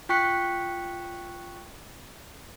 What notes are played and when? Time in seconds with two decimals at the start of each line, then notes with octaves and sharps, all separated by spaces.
0.09 F4 G5 C#6 F#6 B6 C#7